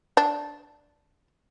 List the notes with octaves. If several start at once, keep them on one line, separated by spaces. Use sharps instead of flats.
D4